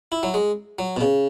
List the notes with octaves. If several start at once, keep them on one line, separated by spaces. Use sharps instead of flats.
E4
F#3
G#3
F#3
B2
C#3